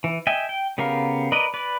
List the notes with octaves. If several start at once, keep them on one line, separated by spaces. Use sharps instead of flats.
E3
D#5 E5 G5 G#5
G5
C#3 B3 G4 A#4 F5
A#4 B4 D5 D#5
B4 D5